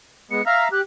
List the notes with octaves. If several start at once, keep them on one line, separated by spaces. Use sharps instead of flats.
G#3 B3 C#7
E5 F5 A#5 F6
G4 F#6